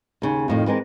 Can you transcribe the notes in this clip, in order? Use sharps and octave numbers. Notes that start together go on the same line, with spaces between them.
D#2 C#3
F2 A2 D#3
E3 G#3 C4 A#4 B4